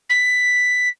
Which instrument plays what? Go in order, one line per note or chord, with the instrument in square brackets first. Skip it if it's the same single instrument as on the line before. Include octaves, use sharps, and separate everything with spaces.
[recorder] B6